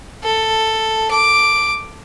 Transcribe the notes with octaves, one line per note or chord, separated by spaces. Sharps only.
A4
D6